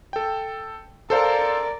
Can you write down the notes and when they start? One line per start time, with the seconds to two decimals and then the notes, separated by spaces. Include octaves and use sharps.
0.13 A4 G5
1.10 A4 A#4 C5 D5 F5